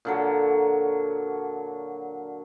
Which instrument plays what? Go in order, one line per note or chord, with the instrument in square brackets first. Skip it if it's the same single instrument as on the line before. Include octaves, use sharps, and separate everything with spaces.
[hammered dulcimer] A#2 D3 F#3